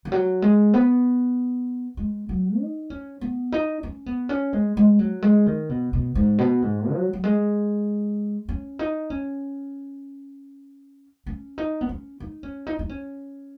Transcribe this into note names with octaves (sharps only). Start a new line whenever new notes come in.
D#3
F#3
G#3
B3
G#3
F#3
D#4
C#4
B3
D#4
C#4
B3
C#4
G#3
G#3
F#3
G#3
D#3
B2
B2
G#2
B2
G#2
F#3
F#3
G#3
C#4
D#4
C#4
C#4
D#4
B3
C#4
D#4
C#4
D#4
D#4
C#4